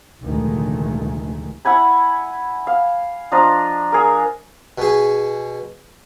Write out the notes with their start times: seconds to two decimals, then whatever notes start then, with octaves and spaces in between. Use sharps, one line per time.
0.22 F1 D2 A#2 D#3 G#3 A3
1.65 E4 F#5 G#5 B5
2.67 F5
3.32 F3 D4 D#5 A#5
3.92 G#4 A#4
4.78 B2 G#4